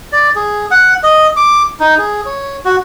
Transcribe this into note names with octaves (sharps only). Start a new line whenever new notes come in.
D5
G#4
F#5
D#5
D6
D#4
G#4
C#5
F#4